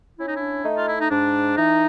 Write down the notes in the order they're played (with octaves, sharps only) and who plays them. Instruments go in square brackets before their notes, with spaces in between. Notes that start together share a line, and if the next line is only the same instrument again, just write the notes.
[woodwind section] C#4 E4
D#4
D4 E4
A3 D#4
F4
E4
D#4
G#2 D4
E3 D#4